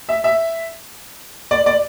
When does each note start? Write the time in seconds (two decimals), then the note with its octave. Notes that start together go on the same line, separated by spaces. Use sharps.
0.09 E5
0.24 E5
1.51 D5
1.66 D5